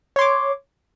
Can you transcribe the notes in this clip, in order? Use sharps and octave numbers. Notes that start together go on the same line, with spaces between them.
C#5 C6 D6